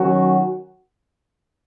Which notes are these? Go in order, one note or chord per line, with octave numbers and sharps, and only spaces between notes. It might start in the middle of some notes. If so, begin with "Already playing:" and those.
Already playing: D#3 F#3 C#4 F#4